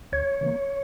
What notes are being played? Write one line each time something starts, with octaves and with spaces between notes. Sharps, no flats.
D2 C#5
C#3 E3 A#3